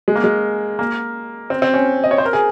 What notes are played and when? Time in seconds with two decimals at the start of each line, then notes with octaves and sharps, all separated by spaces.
0.08 G#3
0.15 A#3
0.24 G#3
0.79 A#3
1.50 C4
1.62 C4
1.74 C#4
2.04 D#5
2.11 C#5
2.18 C5
2.26 A#4
2.33 G#4